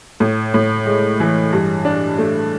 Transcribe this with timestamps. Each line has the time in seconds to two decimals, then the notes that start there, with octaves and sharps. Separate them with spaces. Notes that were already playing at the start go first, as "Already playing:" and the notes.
0.20 A2
0.54 A2
0.86 G#3
1.20 E3
1.52 G2
1.85 D4
2.18 A3